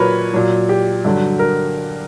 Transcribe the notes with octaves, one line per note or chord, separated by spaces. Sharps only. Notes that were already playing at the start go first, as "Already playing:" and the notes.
Already playing: A#2 F#3 A#4 B4 C#5
A#2 F#3
G4
G2 D3 F#3
A#4